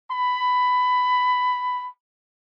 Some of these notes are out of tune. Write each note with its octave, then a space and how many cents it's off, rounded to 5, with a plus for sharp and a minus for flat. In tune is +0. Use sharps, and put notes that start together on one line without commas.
B5 +15